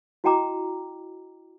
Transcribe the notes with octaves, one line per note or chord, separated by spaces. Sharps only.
E4 F#4 D#5 G5 A#5 D6